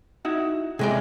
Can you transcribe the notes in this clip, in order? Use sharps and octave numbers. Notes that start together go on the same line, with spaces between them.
D#4 E4 F#4
C3 G#3 G#4 D5